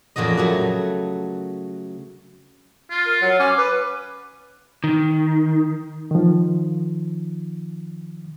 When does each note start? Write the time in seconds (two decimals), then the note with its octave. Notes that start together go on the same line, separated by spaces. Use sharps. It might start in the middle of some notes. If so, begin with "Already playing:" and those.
0.16 F2 A#2 C#3 F#4 D#5
0.37 F#3 A3 F#4
2.90 F4
3.06 A#4
3.22 F#3
3.40 C#4 D6
3.58 B4
4.84 D#3
6.11 D#3 F3